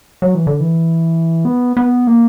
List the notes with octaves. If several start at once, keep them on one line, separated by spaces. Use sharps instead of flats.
F#3
E3
D3
E3
B3
B3
A#3